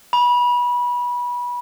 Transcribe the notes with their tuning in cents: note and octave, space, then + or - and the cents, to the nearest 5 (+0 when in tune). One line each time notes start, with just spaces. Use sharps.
B5 -25